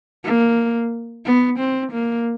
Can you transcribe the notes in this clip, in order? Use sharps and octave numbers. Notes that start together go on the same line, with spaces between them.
A#3
B3
C4
A#3